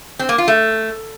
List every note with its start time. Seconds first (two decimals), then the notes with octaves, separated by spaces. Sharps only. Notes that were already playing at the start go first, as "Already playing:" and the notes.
0.19 C4
0.29 A#3
0.38 F4
0.48 A3